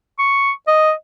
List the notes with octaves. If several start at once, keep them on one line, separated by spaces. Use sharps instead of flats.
C#6
D#5